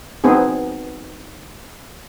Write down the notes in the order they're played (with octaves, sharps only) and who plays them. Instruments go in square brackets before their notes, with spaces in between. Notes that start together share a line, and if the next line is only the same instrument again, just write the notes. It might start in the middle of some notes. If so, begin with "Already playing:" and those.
[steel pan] B3 C4 D#4 G#4